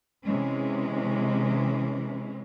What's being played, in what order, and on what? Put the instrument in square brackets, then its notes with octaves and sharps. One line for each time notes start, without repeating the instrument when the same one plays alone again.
[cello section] C3 E3 G#3 C#4